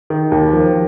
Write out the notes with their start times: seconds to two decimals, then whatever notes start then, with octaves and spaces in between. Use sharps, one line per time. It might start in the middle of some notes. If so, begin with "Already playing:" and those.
0.10 D#3
0.32 D#2
0.53 F3